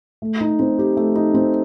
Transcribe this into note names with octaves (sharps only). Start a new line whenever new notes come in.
A3
D#4
C4
G4
A3
D#4
C4